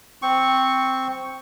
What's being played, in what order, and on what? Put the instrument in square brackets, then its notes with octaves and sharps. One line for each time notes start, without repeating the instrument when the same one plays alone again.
[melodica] C4 C#6